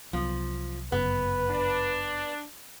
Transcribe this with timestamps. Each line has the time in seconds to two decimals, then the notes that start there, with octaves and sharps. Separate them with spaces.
0.13 C2 F3 F#3 B3
0.92 G1 F#2 C#3 B3 B4
1.51 D4